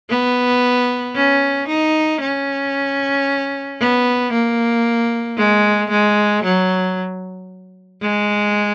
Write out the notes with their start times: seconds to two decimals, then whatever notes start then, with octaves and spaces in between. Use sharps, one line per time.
0.10 B3
1.15 C#4
1.68 D#4
2.21 C#4
3.80 B3
4.32 A#3
5.37 G#3
5.91 G#3
6.43 F#3
8.02 G#3